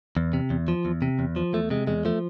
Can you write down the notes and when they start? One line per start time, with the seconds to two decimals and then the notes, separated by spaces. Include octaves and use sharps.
0.17 E2
0.33 C3
0.50 E2
0.68 F3
0.85 E2
1.02 C3
1.19 E2
1.36 F3
1.53 E2 A3
1.70 C3 G#3
1.87 E2 G#3
2.05 F3 A3